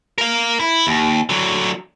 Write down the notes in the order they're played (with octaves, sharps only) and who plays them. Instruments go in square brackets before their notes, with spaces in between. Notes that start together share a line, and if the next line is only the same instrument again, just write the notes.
[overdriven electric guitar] A#4 F5
E4
D#2
D3 F#3